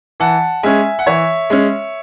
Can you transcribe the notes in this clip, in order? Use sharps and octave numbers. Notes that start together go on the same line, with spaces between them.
E3 F#5 A5
G#3 C#4 E5 G#5
F#5
E3 C#5 E5
G#3 C#4